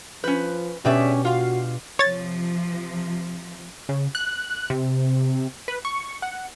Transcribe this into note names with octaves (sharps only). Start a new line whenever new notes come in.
F3 C#4 B4 G6
B2 C#4 D4 G4 G#4 D5 E5
F4 F#4 F5
C3 F3 C#5 A6
C#3
F#6
C3
B4
C#6
F#5